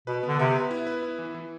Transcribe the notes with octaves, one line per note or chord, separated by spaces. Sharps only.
B2 B4
D3 B3
C3 B3
B4
E4
B4
E4
E3
E3